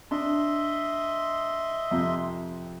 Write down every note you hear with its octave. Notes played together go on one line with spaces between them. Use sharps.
D4 D#5 E5 C6
F2 C3